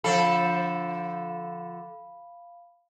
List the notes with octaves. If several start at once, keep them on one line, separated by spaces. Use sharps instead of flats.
D3 F3 A4 F5 B5